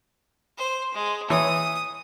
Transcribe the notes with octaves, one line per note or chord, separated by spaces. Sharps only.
C5
G#3
E3 C#5 D#6